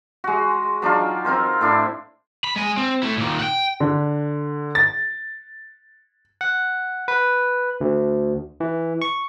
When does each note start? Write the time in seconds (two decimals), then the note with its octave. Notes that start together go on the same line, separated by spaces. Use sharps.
0.24 G#3 F#4
0.82 F#3 D4 D#4 F4
1.25 C4 D#4 A#4 C5
1.61 A2 D4 E4
2.44 B5
2.56 G#3 G#5
2.77 C4
3.03 A3 E4
3.17 A#2 D#3
3.39 F#5 G5
3.80 D3
4.75 A6
6.41 F#5
7.08 B4
7.81 D2
8.60 E3
9.02 C#6